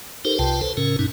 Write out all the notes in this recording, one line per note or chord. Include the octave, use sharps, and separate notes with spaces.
D#4 G4 A4 A#4 C5
C2 C3 F4 B4 G5 A5
A4 B4 C5
A2 C#3 C#4 A#4
G2 B2 C#4 D#4